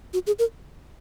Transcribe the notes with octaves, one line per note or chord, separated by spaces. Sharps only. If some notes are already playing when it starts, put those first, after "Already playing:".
F#4
G#4
A#4